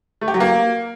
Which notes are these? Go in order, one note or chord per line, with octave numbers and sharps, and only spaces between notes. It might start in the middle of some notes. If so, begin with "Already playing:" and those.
A3
G4
F#3
A#3